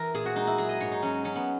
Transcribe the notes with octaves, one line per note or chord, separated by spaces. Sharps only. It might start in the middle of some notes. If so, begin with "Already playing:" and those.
Already playing: E3 A#4
A#2 G#4
F#4
G#3 D#4
E4
F#3 G#4
D#5
G#2 C#5
D#4
F#3 C#4
F#3 C#4
B3